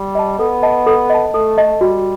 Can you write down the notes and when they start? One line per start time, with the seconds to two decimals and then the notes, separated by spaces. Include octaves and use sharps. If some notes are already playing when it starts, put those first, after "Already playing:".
Already playing: G3
0.15 D#5 A5
0.39 B3 A4
0.63 D#5 A5
0.86 A4
1.10 D#5 A5
1.33 A3 A4
1.58 D#5 A5
1.81 G3 F#4